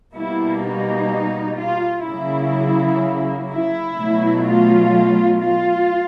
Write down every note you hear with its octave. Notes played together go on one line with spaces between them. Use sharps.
B2 G3 A#3 E4
D#4
F4
C#3 F#3 A#3 E4
E4
B2 F#3 A3
F4
F4